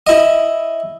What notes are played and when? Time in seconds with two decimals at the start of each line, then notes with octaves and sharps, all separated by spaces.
0.07 E4 D#5